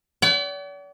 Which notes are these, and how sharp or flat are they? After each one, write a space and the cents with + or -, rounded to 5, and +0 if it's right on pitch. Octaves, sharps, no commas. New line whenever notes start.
D5 -45 F#5 +45